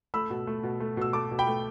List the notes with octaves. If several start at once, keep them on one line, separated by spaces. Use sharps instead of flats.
A3 B5 E6
B2
A3
B2
A3
B2 E6
A3 A5 D6
B2
G5 B5
A3